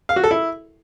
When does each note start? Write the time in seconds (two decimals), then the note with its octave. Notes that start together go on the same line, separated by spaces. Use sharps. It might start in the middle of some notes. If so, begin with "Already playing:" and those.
0.09 F5
0.16 F#4
0.24 A4
0.31 E4